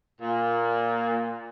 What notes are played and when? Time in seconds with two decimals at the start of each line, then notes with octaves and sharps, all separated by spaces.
0.21 A#2